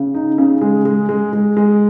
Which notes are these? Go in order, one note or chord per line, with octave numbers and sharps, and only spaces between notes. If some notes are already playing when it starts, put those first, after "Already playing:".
Already playing: C#3
D#4
C#3
G#3
G#3
G#3
G#3
G#3